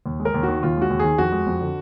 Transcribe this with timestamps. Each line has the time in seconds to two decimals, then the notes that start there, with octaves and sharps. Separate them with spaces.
0.06 D#2
0.20 G#3
0.25 A#4
0.34 D#2
0.43 F#4
0.48 D#3
0.63 D#2 F4
0.77 G#3 F#4
0.90 D#2
1.00 D#3 G#4
1.18 F2 F#4
1.32 G#3
1.46 F2
1.61 D3